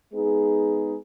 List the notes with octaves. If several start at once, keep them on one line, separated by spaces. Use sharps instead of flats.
G#3 B3 D#4 G#4